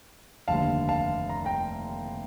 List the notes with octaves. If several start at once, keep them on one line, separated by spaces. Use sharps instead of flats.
F1 D#2 D3 G3 F5 A5
F5 A5
A#5
G5 A#5